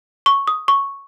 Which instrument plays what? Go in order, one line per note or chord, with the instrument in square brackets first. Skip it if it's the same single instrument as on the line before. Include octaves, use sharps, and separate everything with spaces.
[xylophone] C#6
D#6
C#6